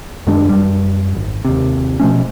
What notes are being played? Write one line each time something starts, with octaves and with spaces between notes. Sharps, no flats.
F#2 D#3 G#3 D4
F#2 G3
G#1
D#2 C3
B2 F3 A3 C#4